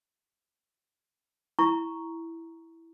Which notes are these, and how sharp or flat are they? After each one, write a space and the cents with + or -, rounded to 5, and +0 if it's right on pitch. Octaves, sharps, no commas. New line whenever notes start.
E4 +0 A#5 +0 C#6 +0